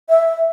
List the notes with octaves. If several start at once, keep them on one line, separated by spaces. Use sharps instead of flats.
E5